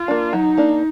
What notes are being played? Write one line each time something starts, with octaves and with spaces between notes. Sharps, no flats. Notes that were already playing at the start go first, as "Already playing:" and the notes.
Already playing: F4
A#3 D4
F#3 D#4
A#3 D4